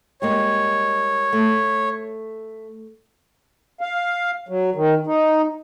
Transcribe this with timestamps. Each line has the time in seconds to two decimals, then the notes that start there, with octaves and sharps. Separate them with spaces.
0.22 G3 G#3 A#3 C#5
1.33 A3
3.81 F5
4.49 F#3
4.75 D#3
5.07 D#4